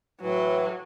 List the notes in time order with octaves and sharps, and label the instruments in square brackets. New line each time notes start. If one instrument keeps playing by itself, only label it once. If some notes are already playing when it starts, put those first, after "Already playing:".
[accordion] A2 E3 [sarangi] F#3